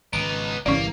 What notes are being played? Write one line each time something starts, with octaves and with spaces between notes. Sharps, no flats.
G#1 C#2 B3 D#4 D7
G1 C2 E3 G3 A#3 C#4 D5